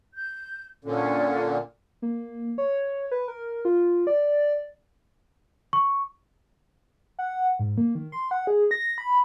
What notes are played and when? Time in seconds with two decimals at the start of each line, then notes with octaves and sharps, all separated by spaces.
0.13 G6
0.85 A#2 D3 C#4 F4
2.02 A#3
2.58 C#5
3.11 B4
3.28 A#4
3.65 F4
4.07 D5
5.73 C#6
7.19 F#5
7.59 G#2
7.78 A#3
7.95 D#3
8.12 C6
8.31 F#5
8.47 G#4
8.71 A#6
8.98 B5